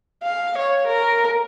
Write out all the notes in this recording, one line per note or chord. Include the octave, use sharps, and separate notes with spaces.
F5
C#5
A#4